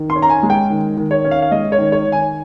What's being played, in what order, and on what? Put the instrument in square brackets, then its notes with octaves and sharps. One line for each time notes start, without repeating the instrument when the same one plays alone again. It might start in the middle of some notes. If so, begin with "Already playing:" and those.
Already playing: [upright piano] D#3
[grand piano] C6
[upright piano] C#4
[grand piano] A#5
G#5
[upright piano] G#3
[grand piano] G5
[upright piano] D#3
D#3
[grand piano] C#5
[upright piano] C#4
[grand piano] F5
F5
[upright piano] G#3 [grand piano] D#5
[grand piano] C#5
[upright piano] D#3
[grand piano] C#5
[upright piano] D#3
[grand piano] G#5